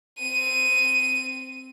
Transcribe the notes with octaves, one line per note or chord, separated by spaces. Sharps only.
C4 D#7